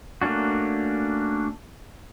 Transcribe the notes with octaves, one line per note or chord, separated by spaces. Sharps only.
A3 A#3 C#4 D4 F#4